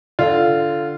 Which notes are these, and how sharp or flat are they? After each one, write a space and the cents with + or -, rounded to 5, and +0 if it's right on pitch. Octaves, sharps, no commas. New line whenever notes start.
D3 +0 F4 -10